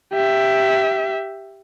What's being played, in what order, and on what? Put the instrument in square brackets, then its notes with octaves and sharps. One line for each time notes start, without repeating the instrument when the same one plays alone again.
[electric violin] G4 E5